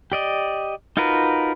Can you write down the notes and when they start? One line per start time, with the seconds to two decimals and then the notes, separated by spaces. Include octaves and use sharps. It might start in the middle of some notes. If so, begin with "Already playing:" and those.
0.12 G4 D5 D#5
0.97 D#4 F4 F#4 A#4 B4